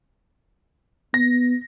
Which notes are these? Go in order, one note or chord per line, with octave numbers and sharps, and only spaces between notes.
B3 A#6